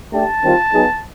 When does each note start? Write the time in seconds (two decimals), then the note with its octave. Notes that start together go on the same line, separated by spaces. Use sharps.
0.13 A3 D4 G4 A5
0.43 D#3 G3 C4 F4
0.72 F#3 B3 D#4 G#4